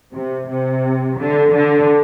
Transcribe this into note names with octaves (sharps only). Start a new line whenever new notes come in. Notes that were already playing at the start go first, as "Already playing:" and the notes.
C3
C3
D3
D3